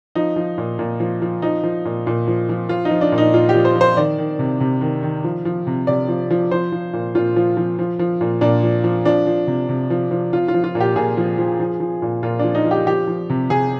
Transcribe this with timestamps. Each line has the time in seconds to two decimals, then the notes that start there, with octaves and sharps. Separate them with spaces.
0.15 F3 D#4
0.36 F3
0.58 A#2
0.79 A#2
1.00 F3
1.22 F3
1.42 F3 D#4
1.64 F3
1.85 A#2
2.07 A#2
2.28 F3
2.49 F3
2.69 F3 F4
2.85 D#4
2.91 F3
3.01 D4
3.12 A#2
3.18 D#4
3.34 A#2 F4
3.49 G4
3.55 F3
3.65 C5
3.76 F3
3.81 C5
3.97 D#3 D5
4.18 D#3
4.39 C3
4.60 C3
4.81 D#3
5.03 D#3
5.24 F3
5.45 F3
5.67 C3
5.87 C3 D5
6.08 F3
6.31 F3
6.51 F3 C5
6.72 F3
6.93 A#2
7.15 A#2 F4
7.36 F3
7.57 F3
7.79 F3
7.99 F3
8.21 A#2
8.41 A#2 D4
8.63 F3
8.84 F3
9.05 F3 D4
9.27 F3
9.47 C3
9.69 C3
9.90 F3
10.11 F3
10.33 F3 F4
10.48 F4
10.54 F3
10.64 F4
10.75 A#2
10.80 G4
10.96 A#2 G#4
11.17 F3
11.38 F3
11.60 F3
11.80 F3
12.02 A#2
12.23 A#2 F4
12.39 F3 D4
12.55 D#4
12.65 F3
12.71 G4
12.87 F3 G4
13.07 F3
13.30 C3
13.50 C3 G#4